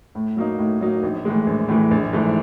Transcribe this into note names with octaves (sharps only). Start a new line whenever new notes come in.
A2
F#3 A#3 D#4
A2
F#3 A#3 D#4
A#1
A2 E3 G#3
A#1
A2 E3 G#3
A#1
G#2 E3 A3